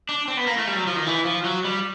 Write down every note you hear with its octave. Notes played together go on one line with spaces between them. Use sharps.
D4
C4
B3
A#3
A3
G3
F#3
F3
D#3
E3
F3
F#3
G3